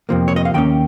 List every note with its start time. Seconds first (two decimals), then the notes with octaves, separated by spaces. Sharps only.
0.09 F2 C3 F3 A#3
0.28 C#5
0.36 D#5
0.45 F5
0.54 D#2 D#3 A#3 C#4 G5